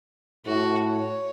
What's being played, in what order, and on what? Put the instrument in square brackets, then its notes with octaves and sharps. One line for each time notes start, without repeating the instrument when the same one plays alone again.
[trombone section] A2 [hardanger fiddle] F#4
[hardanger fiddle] C#5